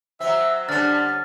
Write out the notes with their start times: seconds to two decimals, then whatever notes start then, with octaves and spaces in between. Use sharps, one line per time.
0.20 F#3 C4 E5
0.69 D3 G3 C#4 D4 F6 A6